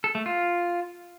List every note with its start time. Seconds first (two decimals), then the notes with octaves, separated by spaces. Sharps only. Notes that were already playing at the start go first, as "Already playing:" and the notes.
0.04 A4
0.15 A3
0.26 F4